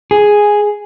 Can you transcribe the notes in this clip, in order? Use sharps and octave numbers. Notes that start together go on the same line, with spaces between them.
G#4